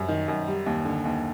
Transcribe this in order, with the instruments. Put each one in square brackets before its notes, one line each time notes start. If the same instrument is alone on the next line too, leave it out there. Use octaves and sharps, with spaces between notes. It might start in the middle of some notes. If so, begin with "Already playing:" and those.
Already playing: [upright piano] F#2 G3
D#3
F#2
G3
D#2
D3
D#2